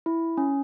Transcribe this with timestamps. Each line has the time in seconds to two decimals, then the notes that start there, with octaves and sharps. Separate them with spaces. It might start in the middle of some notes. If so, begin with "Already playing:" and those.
0.06 E4
0.37 C#4